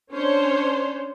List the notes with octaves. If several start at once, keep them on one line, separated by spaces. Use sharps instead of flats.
C#4 D4 C5 C#5